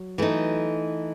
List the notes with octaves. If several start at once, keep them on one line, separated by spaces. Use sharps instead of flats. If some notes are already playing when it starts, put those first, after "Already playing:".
Already playing: F#3
E3 A3 D#4